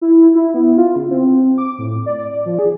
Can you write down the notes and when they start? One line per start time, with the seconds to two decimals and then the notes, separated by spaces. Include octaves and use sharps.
0.01 E4
0.35 E4
0.54 B3
0.77 F4
0.96 C#3
1.11 C4
1.58 D6
1.78 A2
2.06 D5
2.46 F3
2.59 G#4